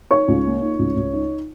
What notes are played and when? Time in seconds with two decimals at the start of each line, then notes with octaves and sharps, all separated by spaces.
0.11 D#4 C#5 C#6
0.28 C#2
0.46 A#3
0.61 D#4
0.79 C#2
0.96 C#2
1.13 D#4